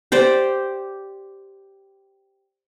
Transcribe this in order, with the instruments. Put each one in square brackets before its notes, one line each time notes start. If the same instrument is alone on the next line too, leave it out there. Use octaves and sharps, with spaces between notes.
[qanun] G4 C5 D5